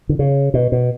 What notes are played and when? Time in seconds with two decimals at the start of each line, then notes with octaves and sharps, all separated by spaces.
0.09 D3
0.19 C#3
0.54 B2
0.72 B2